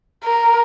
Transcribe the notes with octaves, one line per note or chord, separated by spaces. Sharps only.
A#4